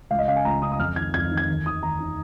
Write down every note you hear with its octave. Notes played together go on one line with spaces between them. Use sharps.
C#2 F5
D#5
C#3 F5
G#5
C#2 A#5
C#3 D#6
D#6
F2 F6
D#3 G#6
F2 G#6
D#3
G#6
D#2
D#3 D#6
D#2 A#5
D#3